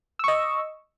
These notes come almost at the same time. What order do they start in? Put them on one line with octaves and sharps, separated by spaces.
E6 C#6 D#5